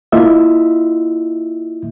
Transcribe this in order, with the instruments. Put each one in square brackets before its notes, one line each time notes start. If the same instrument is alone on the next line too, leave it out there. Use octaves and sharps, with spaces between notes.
[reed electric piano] A#3 E4 F4 D#5 E5